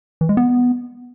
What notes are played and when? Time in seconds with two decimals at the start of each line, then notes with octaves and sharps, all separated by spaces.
0.21 E3
0.29 G#3
0.37 B3